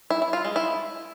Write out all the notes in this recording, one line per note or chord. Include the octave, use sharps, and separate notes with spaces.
E4
E4
F4
G#3
E4